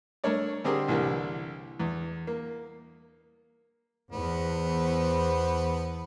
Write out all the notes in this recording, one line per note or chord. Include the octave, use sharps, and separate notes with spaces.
A3 D4 A#4 C#5 D5
D3 G3 C4 G4 G#4 A#4
C2 D3 E3 G3 A#3
E2
A#3
E2 B3 C5